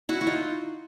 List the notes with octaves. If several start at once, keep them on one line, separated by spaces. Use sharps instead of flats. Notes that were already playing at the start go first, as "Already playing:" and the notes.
E4 F#4
F#4
D#4 F4